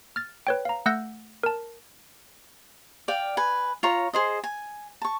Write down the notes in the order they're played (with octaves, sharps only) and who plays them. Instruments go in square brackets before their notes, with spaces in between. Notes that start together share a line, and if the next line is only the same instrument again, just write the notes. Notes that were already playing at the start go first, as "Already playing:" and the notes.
[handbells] F6 A6
B4 C#5 G5
F5 A#5
A3 F#5 E6 F#6 G6 A#6
A#4 A5
[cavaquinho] D5 F5 G5
B4 G#5
F4 C#5 A#5
G#4 C5 D#5
G#5
A5 C#6